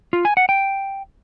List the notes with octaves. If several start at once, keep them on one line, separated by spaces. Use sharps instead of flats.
F4
G#5
F#5
G5